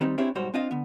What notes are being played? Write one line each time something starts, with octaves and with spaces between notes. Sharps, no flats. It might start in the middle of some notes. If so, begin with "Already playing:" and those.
D#3 G3 C4 D#4
C4 D4 E4 G4 G#4 C#5
B1 G#2 G3 F#4 C5 C#5
C4 D4 F4 D#5 F5
D3 B3